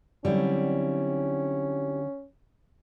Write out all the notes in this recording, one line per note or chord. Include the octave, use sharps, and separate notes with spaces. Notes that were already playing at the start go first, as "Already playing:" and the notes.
D3 F#3 G3 C4 C#4 E4